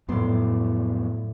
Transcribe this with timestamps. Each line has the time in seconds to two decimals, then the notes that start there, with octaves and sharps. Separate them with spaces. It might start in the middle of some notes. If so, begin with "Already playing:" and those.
0.09 F2 A2 F#3 B3 D5 C6